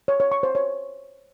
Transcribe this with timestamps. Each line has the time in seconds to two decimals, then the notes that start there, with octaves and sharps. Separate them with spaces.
0.08 C#5
0.20 C#5
0.32 C#6
0.43 C5
0.55 C#5